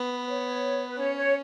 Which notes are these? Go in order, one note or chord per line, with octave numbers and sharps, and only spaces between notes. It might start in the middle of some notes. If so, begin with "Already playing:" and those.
Already playing: B3
B4
C#5
B4
C#4 C#5
C#5